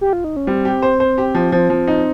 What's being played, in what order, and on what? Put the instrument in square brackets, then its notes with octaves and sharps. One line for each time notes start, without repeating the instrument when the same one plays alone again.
[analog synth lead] G4
F4
D#4
C#4
[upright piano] G3 [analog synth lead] C4
[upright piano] G4
C5
C5
G4
F3
F3
F3
D#4